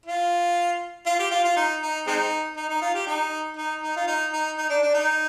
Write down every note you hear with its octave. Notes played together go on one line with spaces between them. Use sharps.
F4
F4
G4
F4
F4
D#4
D#4
G#3 C4 D#4
D#4
D#4
F4
G4
D#4
D#4
D#4
F4
D#4
D#4
D#4
D4
D4
D#4